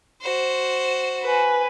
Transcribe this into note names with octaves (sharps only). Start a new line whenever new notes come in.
F#4 C5
B4 G#5